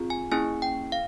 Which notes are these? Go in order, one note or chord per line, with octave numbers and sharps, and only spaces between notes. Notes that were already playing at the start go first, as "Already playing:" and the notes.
Already playing: C4 F4 G#4
G#5
A#3 C#4 E4 G#4 G#5
G5
F5